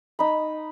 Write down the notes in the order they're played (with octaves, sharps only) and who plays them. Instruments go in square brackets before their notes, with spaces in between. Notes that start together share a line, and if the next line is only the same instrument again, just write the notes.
[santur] D#4 B5